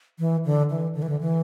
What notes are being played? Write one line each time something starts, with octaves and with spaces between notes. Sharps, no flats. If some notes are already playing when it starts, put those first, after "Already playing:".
E3
D3
E3
D3
E3
D3
E3